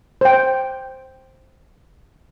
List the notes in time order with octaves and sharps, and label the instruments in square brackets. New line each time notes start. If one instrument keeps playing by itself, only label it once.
[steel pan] C5 G5